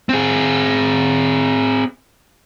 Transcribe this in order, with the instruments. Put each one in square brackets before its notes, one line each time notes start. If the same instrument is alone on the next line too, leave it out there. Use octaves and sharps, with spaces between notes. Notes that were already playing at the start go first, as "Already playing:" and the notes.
[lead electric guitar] C4 G#4